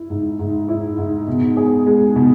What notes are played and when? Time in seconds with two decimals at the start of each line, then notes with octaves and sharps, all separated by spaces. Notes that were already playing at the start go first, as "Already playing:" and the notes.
Already playing: E4
0.10 G#2
0.39 G#2
0.69 E4
0.98 G#2
1.28 B2
1.56 G#4
1.86 G#3
2.16 B2